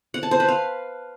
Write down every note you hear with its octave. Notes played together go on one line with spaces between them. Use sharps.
F#5
A5
C5
B4
F5